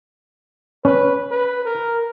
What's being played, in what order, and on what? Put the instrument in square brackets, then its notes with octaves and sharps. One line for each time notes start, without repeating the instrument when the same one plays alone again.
[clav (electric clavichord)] C#4 [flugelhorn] B4
[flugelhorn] B4
A#4